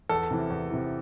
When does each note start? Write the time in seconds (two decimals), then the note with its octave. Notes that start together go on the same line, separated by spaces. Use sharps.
0.09 E2 A4
0.31 C3 E3
0.50 E2
0.70 C3 E3